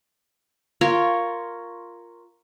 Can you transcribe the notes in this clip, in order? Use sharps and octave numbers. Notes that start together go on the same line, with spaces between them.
F4 A#4 C#5